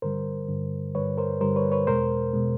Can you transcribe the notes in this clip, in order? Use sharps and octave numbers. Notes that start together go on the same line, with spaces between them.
G2 D3 G3 A#4 C5
G2 D3 G3
G2 D3 G3 B4 C#5
A#4 C5
G2 D3 G3 A#4 C5
B4 C#5
B4 C#5
E2 B2 G#3 A#4 C5
B2 G#3